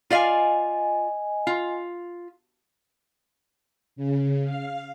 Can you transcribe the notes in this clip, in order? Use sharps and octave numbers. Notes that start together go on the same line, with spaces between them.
F4 D5 D#5 F5 G#5
F4
C#3
F5